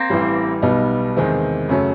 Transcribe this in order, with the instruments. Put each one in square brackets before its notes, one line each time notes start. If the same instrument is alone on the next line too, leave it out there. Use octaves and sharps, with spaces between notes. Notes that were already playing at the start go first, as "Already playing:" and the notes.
Already playing: [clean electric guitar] A#3 C4
[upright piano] A1 A2 E3 G3
B1 B2 G3 B3 D#4
E2 C3 D#3 G#3 C4
F#2 C#3 F#3 A3 C#4